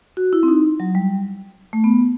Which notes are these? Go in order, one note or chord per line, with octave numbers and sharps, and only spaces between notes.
F#4
E4
C4
D#4
F#3
G3
A3
B3